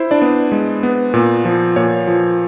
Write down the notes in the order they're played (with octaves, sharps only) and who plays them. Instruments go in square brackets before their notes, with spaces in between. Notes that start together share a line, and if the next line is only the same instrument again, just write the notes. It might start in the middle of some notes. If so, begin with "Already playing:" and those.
Already playing: [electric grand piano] E4 C5
D4 D5
B3
G#3
B3
A#2
F3
A#2 C#5
F3